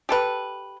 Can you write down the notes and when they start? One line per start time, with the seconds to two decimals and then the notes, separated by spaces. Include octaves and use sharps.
0.09 G4 A4 B4